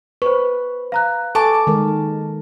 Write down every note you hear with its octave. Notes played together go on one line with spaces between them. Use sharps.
B4 C5 C#6
F5 A#5 F#6
A4 G#5 A5 C#6 D6
D#3 G#3 A#4